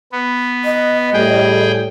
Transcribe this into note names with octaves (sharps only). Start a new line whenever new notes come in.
B3
D#5
A2 G3 G#4 G5